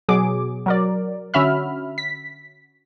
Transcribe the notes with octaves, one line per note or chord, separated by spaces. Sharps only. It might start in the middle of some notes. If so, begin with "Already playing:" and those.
B2 F#3 G#4 D6
F#3 A#4 D5
D3 C#4 F#4 E5 B5 F6
B6